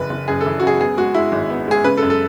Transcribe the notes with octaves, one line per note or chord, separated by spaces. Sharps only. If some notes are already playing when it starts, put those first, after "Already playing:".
Already playing: F#1 E3 B4
F#1
F#2 G#4
A4
E3
F#4
F#2 G#4
B3 G#4
G#3 F#4
G#3 E4
G#1
B3
G#3 G#4
C#3 B4
A4
F#2
A4